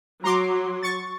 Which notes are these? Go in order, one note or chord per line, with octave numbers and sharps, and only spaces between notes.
F#3 A#5 C6 D6
C#6 A6